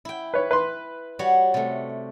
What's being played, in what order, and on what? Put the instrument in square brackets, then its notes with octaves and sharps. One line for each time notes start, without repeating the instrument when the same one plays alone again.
[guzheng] E4 G5
[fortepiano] B4 C#5
B4 C6
[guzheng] G3 F#4 C#5
C3 A3